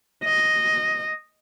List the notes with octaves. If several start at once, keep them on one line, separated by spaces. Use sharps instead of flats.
D#5